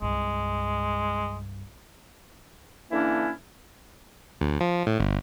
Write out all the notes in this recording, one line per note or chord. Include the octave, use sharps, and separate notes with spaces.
C2 G2 G#3
D3 E3 A#3 C#4 D4 E4
D2
F3
A2
G1